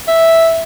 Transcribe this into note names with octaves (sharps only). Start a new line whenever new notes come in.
E5